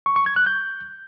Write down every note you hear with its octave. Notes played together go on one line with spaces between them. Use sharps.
C#6
C#6
G#6
F#6
G6